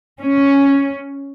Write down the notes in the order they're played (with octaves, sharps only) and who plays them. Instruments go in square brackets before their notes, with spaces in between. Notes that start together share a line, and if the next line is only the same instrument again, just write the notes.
[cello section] C#4